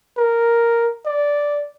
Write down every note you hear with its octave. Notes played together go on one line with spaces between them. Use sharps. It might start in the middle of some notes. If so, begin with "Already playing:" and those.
A#4
D5